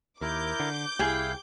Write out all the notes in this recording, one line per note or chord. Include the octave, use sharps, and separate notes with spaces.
D#2 E4 A#4 D6 G6
D3
C2 E4 G#4 F5 G5